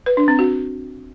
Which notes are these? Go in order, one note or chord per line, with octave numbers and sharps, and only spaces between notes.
B4
D4
C4
F#4